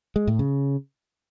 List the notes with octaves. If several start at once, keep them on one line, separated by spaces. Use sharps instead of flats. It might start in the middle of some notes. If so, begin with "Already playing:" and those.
G#3
A2
C#3